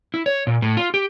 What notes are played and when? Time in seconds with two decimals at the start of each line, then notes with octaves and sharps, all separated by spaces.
0.14 E4
0.26 C#5
0.47 A#2
0.62 A2
0.77 F4
0.94 G4